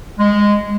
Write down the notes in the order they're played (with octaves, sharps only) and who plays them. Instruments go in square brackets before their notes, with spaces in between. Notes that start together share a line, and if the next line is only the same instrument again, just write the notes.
[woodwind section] G#3